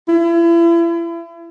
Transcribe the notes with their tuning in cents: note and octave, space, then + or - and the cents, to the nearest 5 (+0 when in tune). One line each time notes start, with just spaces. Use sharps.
E4 +35